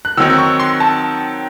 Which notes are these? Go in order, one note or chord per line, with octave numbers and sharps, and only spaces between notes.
F#6
D#3 F#3 C4 D#4 E6
C#6
C6
A5